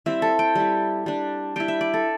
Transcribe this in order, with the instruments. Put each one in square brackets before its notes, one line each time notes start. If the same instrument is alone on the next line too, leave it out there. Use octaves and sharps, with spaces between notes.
[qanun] G3 C4 E4 E5
A4
G5
G3 E4
G3 D4
G3 E4 G5
E5
D5
A4